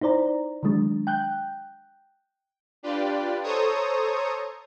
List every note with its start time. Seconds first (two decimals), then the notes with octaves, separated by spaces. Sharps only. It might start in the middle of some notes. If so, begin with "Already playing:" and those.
0.01 D#4 E4 C5 D5 A#5
0.63 D#3 E3 F#3 G#3 D4
1.07 G5 F#6 G6
2.83 D4 F4 G4 B4 D5
3.43 A4 C5 C#5 A#5 C#6 D#6